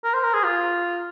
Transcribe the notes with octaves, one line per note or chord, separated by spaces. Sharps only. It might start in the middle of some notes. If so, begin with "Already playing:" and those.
A#4
C5
A#4
G#4
F4